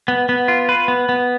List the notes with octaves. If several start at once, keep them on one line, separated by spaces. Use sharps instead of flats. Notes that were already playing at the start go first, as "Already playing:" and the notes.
B3
B3
F4
B4
B3
B3